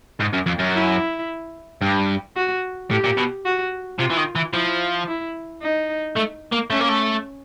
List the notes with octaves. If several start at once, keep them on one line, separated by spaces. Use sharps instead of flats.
G#2
F#2
F2
F#2
E4
G2
F#4
A2 G4
A#2
B2
F#4
C3 F4
E3
D#3
E3
F3 E4
E4
D#4
A3
A#3
A3 C#4
A#3
A3